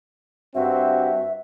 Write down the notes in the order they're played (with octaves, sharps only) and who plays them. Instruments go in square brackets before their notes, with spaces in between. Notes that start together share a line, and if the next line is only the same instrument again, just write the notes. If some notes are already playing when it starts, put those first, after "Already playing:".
[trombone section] G2 C4 F#4 [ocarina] E5